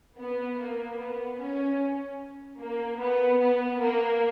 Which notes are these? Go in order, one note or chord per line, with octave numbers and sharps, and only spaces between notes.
B3
A#3
B3
C#4
A#3
B3
B3
A#3